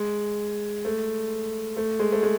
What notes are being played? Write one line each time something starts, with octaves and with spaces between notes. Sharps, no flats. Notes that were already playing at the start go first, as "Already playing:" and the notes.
Already playing: G#3
A3
A3
G#3
A3
G#3